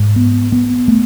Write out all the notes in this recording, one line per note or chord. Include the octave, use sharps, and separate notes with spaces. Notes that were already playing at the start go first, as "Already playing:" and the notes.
Already playing: G#2
B3
B3
A3